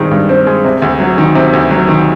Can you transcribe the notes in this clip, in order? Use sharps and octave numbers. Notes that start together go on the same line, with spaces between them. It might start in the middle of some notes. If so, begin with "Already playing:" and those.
Already playing: G2 D#3 G#3 C4
G2
C4
G#3
C3
D2
F#3
D#3
C3
D2
F#3
D#3